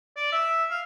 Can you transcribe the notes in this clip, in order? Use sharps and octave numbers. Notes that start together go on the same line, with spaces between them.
D5
E5
F5